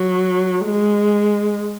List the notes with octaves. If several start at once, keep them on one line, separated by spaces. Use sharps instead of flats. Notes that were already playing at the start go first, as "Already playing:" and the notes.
Already playing: F#3
G#3